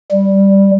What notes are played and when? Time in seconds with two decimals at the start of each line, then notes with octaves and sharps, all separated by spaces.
0.12 G3